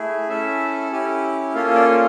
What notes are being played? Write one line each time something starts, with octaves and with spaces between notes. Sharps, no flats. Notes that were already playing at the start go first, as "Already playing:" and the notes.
Already playing: A3 E4 G#4
C#4 E4 A4 E5
C#4 E4 G4
A#3 C#4 F4 A4 F5
D5
A4